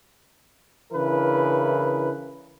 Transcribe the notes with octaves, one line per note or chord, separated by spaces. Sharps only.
C#3 E3 D4 E4 A#4 B4